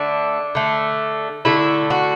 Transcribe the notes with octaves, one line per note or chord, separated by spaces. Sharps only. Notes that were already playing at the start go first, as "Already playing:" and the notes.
Already playing: D3 A3 D4
D3 A3
D3 A3 E4
F#4